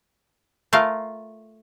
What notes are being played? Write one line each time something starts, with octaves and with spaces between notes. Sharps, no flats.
A3 F4 A#4 F5